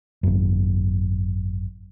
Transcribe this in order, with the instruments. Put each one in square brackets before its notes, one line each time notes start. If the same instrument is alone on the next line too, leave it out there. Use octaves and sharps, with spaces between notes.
[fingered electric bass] G#1 F#2